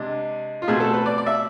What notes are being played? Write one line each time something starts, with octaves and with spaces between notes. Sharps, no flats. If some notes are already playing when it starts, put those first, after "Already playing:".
Already playing: C3 G#3 D4
F4
B2 A3 C4 G#4
A4
B4
D5
D5
E5